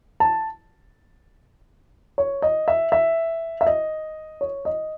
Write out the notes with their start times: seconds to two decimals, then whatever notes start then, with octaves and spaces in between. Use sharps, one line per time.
0.20 A5
2.18 C#5
2.42 D#5
2.68 E5
2.92 E5
3.61 E5
3.67 D#5
4.41 C#5
4.65 D#5